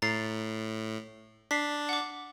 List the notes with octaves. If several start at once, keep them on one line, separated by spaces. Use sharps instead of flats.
A2 A#5 A6 C7
D4 B6 C7
F#5 D6